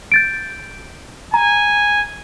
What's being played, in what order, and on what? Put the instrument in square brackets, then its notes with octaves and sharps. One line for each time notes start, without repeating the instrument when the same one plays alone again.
[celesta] G6 A6 D7
[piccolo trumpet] G#5 [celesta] A#5